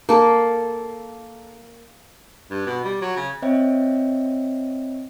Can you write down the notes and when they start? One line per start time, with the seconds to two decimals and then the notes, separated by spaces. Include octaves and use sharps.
0.09 A#3 A4
2.51 G2
2.66 B2
2.85 G3
3.02 F#3
3.17 C#3
3.42 C4 C5 C#5 D#5 E5 G5